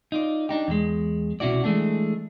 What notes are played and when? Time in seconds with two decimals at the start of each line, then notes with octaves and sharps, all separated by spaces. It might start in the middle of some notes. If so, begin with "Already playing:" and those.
0.12 D#4 F4 D5
0.49 D4 D#4 G4
0.68 E2 G#3
1.40 C2 B2 C#4 E4 F#4 D5
1.64 E3 G#3 A3 D4